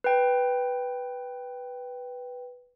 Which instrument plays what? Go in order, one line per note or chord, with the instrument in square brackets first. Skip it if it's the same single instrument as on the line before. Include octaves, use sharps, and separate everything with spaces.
[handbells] B4 G5